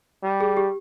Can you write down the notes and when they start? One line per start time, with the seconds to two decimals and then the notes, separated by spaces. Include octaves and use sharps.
0.23 G3
0.40 G#4
0.57 G4